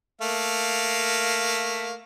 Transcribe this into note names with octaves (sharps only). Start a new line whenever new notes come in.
A3 A#3 F5